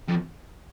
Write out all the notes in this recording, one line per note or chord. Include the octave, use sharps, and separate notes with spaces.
F2